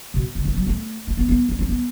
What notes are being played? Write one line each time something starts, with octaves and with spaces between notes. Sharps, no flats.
B2
D3
E3
F#3
A3
A3
B3
B3
C4
C4
B3